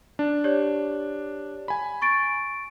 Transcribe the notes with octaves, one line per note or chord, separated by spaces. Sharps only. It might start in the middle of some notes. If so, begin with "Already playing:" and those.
D4
G4 C#5 D5
G#5 B5
C#6 A6 D7